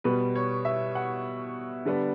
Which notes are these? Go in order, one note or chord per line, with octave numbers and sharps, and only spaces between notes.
B2 G3 B3 B4
C#5
E5
F#5
D3 G3 B3 D4